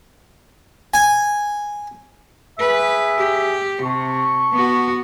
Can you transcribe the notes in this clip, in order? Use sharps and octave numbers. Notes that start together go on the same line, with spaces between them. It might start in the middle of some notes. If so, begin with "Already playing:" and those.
G#5
G#4 B4 E5
G4
C3 A5 C#6
B3 F#4